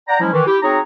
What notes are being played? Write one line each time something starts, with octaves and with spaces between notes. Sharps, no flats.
D5 F#5 G5 A#5
F3 F#3 G#3 C#4 E4
D#3 E3
E4 G4
C4 D#4 F#4 G#4 C#5 A#5